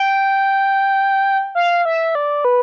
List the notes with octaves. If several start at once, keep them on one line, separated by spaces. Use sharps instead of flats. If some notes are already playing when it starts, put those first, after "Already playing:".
Already playing: G5
F5
E5
D5
B4